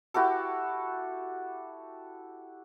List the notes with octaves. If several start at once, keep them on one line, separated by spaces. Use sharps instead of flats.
E4 F#4 G4 A4